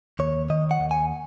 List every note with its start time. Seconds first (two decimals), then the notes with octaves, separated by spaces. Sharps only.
0.19 D#2 C#5
0.50 D#3 D#5
0.71 F#5
0.80 D#2
0.91 G#5